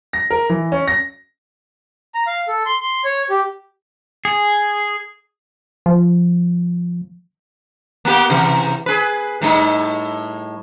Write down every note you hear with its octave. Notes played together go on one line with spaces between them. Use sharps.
A#6
A#4
E3
C#4
A#6
A#5
F5
A4
C6
C6
C#5
G4
G#4
F3
A#3 B3 G4
C3 E3
G#4 B4
A2 G3 D#4